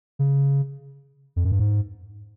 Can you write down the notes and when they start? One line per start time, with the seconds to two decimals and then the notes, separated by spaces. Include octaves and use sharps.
0.19 C#3
1.36 F2
1.44 F#2
1.52 G2
1.59 G#2